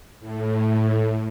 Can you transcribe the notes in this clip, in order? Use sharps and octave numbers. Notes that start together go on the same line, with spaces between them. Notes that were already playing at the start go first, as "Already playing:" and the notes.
A2